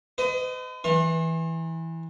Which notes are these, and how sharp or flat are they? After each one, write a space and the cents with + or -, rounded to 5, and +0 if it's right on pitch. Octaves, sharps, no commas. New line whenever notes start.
B4 +45 D#5 +0
E3 -10 C6 +45